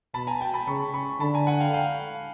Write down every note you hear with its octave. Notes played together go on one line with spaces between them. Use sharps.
B2 A5 B5
G#5 A#5
G5 A5
A5 B5
C#3 B5 C#6
B5 C#6
D3 A5 B5
G#5 A#5
F#5 G#5
F5 G5
F5 G5